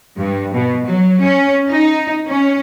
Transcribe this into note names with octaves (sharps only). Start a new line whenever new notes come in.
G2
B2
F#3
C#4
D#4
C#4